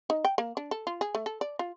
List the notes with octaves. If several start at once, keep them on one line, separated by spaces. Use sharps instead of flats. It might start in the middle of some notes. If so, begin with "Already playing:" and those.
D#4
G5
A#3
D4
A4
F4
G#4
A3
A4
D5
F4